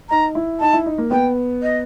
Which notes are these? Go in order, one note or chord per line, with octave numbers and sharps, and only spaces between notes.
D#4 A#5
E4
D#4 A5
E4
D#4
A#3
B3 G5
D#5